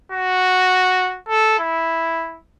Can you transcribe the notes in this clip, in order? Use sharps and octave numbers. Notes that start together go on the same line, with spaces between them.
F#4
A4
E4